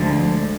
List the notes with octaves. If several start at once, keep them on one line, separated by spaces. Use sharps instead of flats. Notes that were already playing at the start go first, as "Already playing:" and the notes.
Already playing: D2 D3 F3 G#3